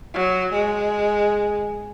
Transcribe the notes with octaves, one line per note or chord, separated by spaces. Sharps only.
F#3
G#3